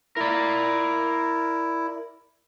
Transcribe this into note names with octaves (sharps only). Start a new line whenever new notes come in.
E4 A#4 D5